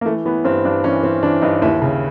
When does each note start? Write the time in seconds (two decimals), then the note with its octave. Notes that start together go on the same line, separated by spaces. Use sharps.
0.01 A#3
0.06 E3 A3
0.25 E3 B3
0.44 G2 C4
0.65 G2 D4
0.84 E3 C#4
1.03 E3 C4
1.23 E3 D4
1.42 G2 D#4
1.62 D#2 E4
1.82 C#3